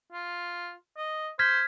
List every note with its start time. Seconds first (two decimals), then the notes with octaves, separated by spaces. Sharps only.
0.12 F4
0.97 D#5
1.39 C5 F6 G#6 B6